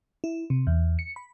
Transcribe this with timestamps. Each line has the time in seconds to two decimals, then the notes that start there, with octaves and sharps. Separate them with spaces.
0.24 E4
0.50 C3
0.67 E2
0.99 C#7
1.16 B5